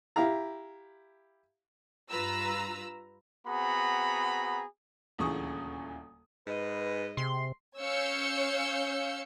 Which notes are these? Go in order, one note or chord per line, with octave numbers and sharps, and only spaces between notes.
E4 G4 F5 A#5
G2 F4 B4 A#5 E6
B3 C4 F#4 G#4 A#5 B5
D#1 D2 C#3 E3 C#6 D#6
G#2 B4 D#5
C3 G#3 C6
C#4 C#5 F5 E6 G6 C#7